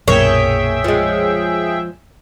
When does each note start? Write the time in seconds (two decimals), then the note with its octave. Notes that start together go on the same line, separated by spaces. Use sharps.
0.08 B1 F#2 A#2 A#3 G#4 C#5 E5 G5
0.84 F3 G#3